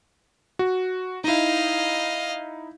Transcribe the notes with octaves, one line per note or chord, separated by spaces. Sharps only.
F#4
D#4 E4 D#5 F5